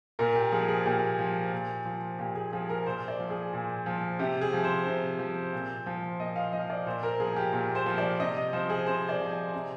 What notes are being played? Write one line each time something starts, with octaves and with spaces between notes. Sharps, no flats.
A#2 A#4
G4
F3 G#4
G#4
A#2 G4
F3
A#2
F3
A#2 G4
G#4
F3 G#4
A#4
A#2 C5
D5
F3
G#4
A#2
F3
C3 G4
G#4
F3
C5
C3
F3
A#2
F3
A#2 D#5
F5
F3 D#5
D5
A#2 C5
A#4
F3 G#4
G4
A#2
C5
F3
D5
C3 D#5
D#5
F3 C5
G#4
C3 C5
D5
F3
G#5
C3